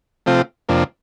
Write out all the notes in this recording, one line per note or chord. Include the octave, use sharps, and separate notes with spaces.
C3 F3 A3 C4 F4
F2 C3 F3 A#3 D4